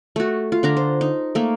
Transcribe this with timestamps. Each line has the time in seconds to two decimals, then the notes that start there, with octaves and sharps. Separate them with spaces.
0.16 A3 F#4
0.52 F4
0.63 D3 D4 A#5
0.77 C5
1.01 D#4
1.35 A3 A#3